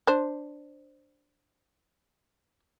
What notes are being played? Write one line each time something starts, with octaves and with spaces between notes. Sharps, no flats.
D4 C5